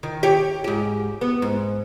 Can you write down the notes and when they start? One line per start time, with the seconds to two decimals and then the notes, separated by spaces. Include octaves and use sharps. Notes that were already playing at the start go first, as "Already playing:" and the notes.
0.03 D#3
0.23 G4 C#5
0.64 G#2 G4
1.21 B3
1.42 G#2